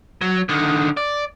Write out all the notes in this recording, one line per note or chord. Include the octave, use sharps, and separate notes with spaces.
F#3
D3 D#3
D5